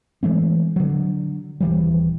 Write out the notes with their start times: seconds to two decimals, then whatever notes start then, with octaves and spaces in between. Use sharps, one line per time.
0.23 E3 G#3 A3 C4
0.76 D3 F#3
1.61 D#1 E3 G3